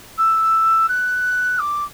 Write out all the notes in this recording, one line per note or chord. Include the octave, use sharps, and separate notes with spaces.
E6
F#6
D6